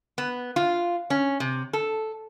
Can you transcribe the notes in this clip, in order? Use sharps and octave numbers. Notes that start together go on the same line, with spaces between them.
B3
F4
C#4
C3
A4